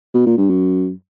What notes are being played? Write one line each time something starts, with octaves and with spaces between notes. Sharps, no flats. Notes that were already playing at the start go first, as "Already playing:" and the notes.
B2
A#2
G2
F#2